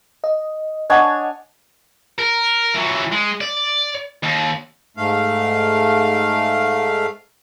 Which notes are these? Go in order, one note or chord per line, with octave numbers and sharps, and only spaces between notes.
D#5
D4 C#5 D#5 F#5 G#5
A#4
E3 F#3
G#3
D5
D#2
G#2 A3 F5